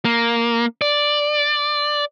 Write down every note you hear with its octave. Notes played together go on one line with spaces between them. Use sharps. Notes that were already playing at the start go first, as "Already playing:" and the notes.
A#3
D5